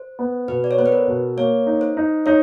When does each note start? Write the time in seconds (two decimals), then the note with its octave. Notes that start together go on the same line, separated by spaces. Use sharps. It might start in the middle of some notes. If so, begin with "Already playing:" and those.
Already playing: C5
0.19 B3
0.48 B2 B4
0.64 D5
0.71 C#5
0.78 B3 C5
0.86 B4
0.92 A#4
1.08 B2
1.37 A#3 C#5
1.67 D#4
1.81 C5
1.97 D#4
2.26 D#4 C#5